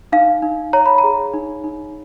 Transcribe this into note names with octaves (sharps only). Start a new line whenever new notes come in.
D#4 F5
D#4
C#5 A#5
B5
A#5
G#4
D#4
D#4